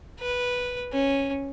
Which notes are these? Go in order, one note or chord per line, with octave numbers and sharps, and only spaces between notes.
B4
C#4